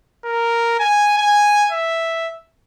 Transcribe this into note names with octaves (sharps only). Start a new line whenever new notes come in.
A#4
G#5
G#5
E5